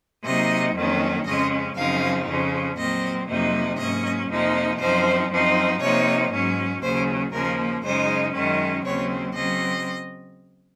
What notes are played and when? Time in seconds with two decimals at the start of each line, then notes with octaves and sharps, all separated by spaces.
0.24 C3 F#3 A#3 D#4 D#5
0.75 F2 D#3 F#3 A#3 C#4
1.25 F2 C#3 G#3 C#4 D#5
1.76 F#2 C#3 F3 C4 D#4 F5
2.28 F2 C#3 F3
2.77 A#2 F#3 C4 D#5
3.28 F2 C3 F#3 A#3 D#4
3.78 G#2 F#3 A#3 C#4 D#5
4.29 F2 C3 F3 A#3 D#4
4.79 F#2 F3 C4 D#4 C5
5.30 F#2 F3 C4 D#4
5.81 C3 F3 A#3 D#4 C#5
6.31 G#2 F#3 C#4
6.82 D#2 C#3 F#3 C5
7.32 D#2 C#3 F3 A#3 A#4
7.83 F#2 C#3 G#3 D#4 C5
8.33 F#2 D#3 G#3 C#4
8.84 D#2 C#3 F#3 C4 C#5
9.34 C#3 F#3 C4 D#5